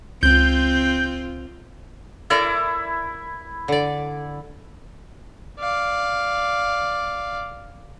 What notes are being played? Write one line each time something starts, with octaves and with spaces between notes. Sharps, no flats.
C#2 C4 F4 G6
E4 A4 A#4 D5
D3 D5
D5 F5